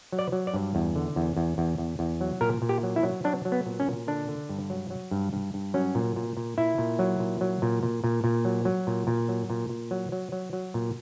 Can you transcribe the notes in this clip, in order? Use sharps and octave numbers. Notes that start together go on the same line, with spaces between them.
F#3
D5
F#3
D5
G2
E2
D3
E2
E2
E2
E2
E2
F#3
A#2 A#4
A#2
G4
F#3
E4
F#3
F#3 D4
F#3
B3
A#2
C#4
A#2
D3 D4
D3
G2
F#3
F#3
G2
G2
G2
F#3 C#4
A#2
A#2
A#2
A#2 E4
A#2
F#3
A#2
F#3
A#2
A#2
A#2
A#2
F#3
F#3
A#2
A#2
F#3
A#2
A#2
F#3
F#3
F#3
F#3
A#2